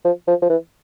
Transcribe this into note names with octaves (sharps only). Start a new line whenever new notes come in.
F3
F3
F3
E3